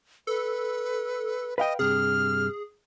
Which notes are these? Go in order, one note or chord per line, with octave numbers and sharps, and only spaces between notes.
A4 B4
B4 D#5 F5 G5
G2 C3 G#4 F6